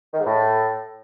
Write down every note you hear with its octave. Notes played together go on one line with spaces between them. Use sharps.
D#3
G#2
A2